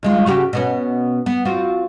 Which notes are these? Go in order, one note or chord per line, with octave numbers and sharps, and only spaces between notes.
D#2 G#3 F4
C#3 F#4 G4
B2 B3 C#4
B3
C4 F4 F#4